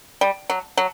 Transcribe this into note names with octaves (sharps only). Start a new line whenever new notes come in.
G3
F#3
F#3